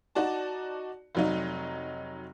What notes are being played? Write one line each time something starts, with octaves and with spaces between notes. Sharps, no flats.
D#4 F#4 D5 A5
F1 F#3 D#4